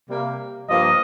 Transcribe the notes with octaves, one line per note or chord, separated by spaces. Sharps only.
C3 G3 A#3
G2 F3 A#3 D#5